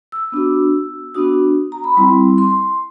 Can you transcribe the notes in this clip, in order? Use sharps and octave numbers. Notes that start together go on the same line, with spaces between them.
E6
B3 D4 F#4
B3 D4 F#4 D#6
A#5
B5
G3 C4 E4 C6
C6